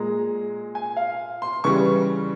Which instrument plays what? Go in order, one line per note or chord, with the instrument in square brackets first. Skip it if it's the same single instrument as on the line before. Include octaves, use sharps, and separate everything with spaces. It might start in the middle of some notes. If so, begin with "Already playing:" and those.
Already playing: [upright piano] A#2 G#3 A#5
G#5
F5
C6
C#3 E3 G3 C#6